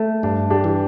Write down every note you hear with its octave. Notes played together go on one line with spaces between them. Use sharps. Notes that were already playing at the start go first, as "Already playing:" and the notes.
Already playing: A3
G2 D4
D4 G4
E3